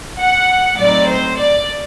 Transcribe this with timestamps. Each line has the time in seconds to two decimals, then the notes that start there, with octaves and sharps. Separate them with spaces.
0.18 F#5
0.77 A2 F#3 C4 D#4 D5
1.07 C5
1.37 D5